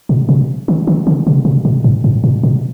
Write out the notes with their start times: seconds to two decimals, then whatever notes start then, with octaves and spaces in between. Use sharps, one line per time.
0.09 A#2
0.29 B2
0.68 D#3
0.87 D#3
1.07 D3
1.27 C3
1.45 B2
1.65 A#2
1.84 G#2
2.04 G#2
2.24 A2
2.44 A#2